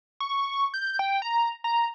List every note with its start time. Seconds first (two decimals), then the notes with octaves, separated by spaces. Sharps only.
0.20 C#6
0.74 G6
0.99 G5
1.22 A#5
1.64 A#5